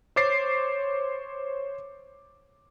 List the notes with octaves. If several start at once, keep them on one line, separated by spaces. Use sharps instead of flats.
C5 C#5 D6 A6 C7